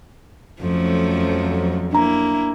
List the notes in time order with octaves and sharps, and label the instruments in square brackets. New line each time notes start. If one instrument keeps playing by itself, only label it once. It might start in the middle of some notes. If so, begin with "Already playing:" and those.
[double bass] F2 F#3 [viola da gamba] F3 A3 C#4
[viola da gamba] A#3 E4 [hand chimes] D4 A#5